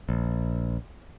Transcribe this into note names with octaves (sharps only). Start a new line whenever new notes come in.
A#1